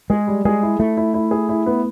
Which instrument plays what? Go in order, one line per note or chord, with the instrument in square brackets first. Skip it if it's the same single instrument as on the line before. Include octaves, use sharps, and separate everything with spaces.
[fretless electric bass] G#3 [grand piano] G#4
[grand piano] G3
[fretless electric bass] G#3 [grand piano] G#4
[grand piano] E4
[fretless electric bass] A3 [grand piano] E4
[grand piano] E4
E4
G#4
E4
B3